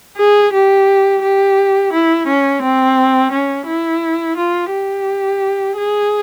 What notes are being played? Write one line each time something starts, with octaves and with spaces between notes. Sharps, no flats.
G#4
G4
G4
E4
C#4
C4
C#4
E4
F4
G4
G#4